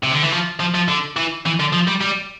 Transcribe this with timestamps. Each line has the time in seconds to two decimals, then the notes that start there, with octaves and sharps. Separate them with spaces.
0.04 C3
0.12 D3
0.23 E3
0.32 F3
0.60 F3
0.75 F3
0.88 D3
1.16 E3
1.46 E3
1.60 D3
1.73 F3
1.87 G3
2.01 G3